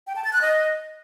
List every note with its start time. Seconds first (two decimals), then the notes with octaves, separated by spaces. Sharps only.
0.07 G5
0.16 A5
0.24 A6
0.33 F#6
0.42 D#5